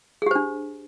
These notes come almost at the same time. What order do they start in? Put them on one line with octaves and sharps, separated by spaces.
G#4 G4 C5 D4